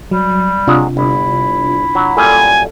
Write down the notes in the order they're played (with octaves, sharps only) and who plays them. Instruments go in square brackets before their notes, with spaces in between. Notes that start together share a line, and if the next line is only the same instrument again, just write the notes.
[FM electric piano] F#3 [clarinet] G3
[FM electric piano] C3 D4 F4 [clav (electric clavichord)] F#3 G#3
[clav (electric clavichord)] G1 [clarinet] E4
[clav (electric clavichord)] F#3
[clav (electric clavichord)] F#2 A#2 G3 [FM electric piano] A4 [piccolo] G#5